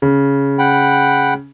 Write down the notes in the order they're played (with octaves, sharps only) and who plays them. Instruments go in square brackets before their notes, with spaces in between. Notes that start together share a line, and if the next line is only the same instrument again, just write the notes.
[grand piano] C#3
[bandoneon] F#5 G5 B5